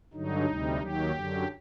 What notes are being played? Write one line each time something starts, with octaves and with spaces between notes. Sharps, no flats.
G2 D3 F#3 D#4
D2 C3 G3
D#2 D#3 F#3 G4
F#2 D3 F#3